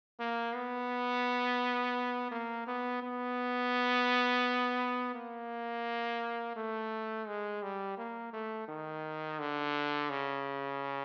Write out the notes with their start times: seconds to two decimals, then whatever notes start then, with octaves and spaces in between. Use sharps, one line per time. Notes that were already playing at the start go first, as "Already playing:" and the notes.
0.20 A#3
0.55 B3
2.31 A#3
2.67 B3
3.02 B3
5.15 A#3
6.56 A3
7.27 G#3
7.63 G3
7.98 A#3
8.33 A3
8.68 D#3
9.39 D3
10.10 C#3